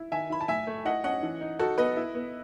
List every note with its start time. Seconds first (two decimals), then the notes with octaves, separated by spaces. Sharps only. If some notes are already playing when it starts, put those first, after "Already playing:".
Already playing: E4
0.12 D#3 E5 G#5
0.30 E4 B5
0.41 A5
0.48 A2 E5 G#5
0.67 A3
0.85 E4 D#5 F#5
1.04 C#4 D#5 F#5
1.23 E3
1.41 D#4
1.59 D#4 F#4 A4
1.78 B3 B4 D#5
1.96 E4
2.15 B3